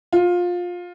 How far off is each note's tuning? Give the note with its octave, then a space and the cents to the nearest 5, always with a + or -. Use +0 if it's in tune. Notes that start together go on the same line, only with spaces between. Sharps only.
F4 +20